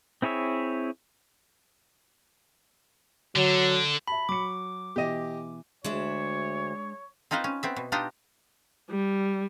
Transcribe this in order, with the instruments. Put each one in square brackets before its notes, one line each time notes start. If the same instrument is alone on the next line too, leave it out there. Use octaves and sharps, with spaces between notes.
[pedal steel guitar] C4 E4 G#4 C#5 E5
[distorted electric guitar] D3 [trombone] F#3
[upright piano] E5 A5 [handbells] B5
[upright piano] F#3 C#6 C#7 [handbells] D6
[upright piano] B2 E3 D#7 [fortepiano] G4 D#5
[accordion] D2 [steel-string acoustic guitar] G#3 D4 E5 [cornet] C#5
[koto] C4 D#4 F4 B4 C5
C#4
B3 C4 E5
B2
D4 D#4 F4 G4 D#5
[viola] G3